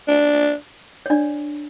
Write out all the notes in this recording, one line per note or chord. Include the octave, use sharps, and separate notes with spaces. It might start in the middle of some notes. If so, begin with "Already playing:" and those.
D4
C#5
D4 D5